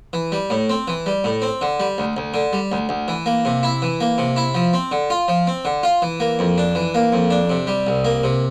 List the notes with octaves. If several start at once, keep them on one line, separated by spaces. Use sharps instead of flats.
E3
G3
A2
C4
E3
G3
A2
C4
D3
G3
D2
D2
D3
G3
D2
D2
E3
A#3
C3
E4
E3
A#3
C3
E4
F3
C4
D3
F4
F3
C4
D3
F4
E3
A#3
F2
D4
E3
A#3
F2
D4
C3
G3
C2
A#3
C3